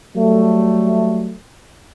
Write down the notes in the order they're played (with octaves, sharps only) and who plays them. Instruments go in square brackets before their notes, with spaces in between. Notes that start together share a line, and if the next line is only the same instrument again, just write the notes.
[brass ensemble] F#3 G3 A3